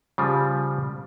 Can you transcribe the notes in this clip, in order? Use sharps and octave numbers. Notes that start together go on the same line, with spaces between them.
C#3 F3 G3